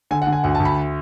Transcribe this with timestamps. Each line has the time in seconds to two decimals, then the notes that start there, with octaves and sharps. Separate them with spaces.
0.11 D3 G#5
0.22 F#5
0.27 D3
0.33 G#5
0.44 D2 F#5
0.55 A5
0.60 D2
0.65 B5